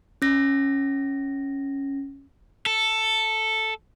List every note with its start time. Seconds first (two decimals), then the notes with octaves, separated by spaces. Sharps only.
0.22 C#4 A#6
2.66 A4